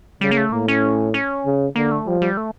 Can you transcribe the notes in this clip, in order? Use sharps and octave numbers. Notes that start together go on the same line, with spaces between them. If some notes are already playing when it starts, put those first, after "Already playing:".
C#3 G3
A#3
A3
A2 A#3
C#4
C#4
C#3
D3 A#3
A3
F3 G3
G3
A3